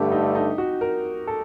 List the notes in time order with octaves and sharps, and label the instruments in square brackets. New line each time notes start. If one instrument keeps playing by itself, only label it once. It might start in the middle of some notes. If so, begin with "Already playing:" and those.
Already playing: [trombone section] G2 D3 A3 [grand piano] G4
[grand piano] D#4
D#4
F#4
A#4
A4